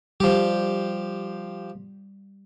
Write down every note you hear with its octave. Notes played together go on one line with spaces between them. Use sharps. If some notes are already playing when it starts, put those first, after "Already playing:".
F3 G3 G4